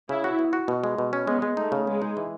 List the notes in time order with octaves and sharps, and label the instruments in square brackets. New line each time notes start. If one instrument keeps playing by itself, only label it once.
[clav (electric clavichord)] C#3 [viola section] E4
[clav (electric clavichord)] F#4
B3
F#4
B2
G#3
B2
C#4
[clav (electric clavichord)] G#3 [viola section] B3
[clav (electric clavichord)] G#3
[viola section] A3 [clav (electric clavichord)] D#4
[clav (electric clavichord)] C#3
[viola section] G#3 [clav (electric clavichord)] B3
[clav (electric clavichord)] D#4
E3